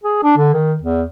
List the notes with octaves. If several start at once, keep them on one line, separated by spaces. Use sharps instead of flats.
G#4
D4
D3
D#3
E2